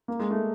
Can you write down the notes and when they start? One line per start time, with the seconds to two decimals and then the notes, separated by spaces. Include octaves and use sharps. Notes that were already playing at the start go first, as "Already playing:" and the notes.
0.08 A#3
0.19 G#3
0.31 A3